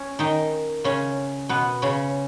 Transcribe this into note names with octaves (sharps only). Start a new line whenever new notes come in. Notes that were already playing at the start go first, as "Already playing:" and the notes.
Already playing: C#4
D#3 D#4
C#3 C#4
B2 B3
C#3 C#4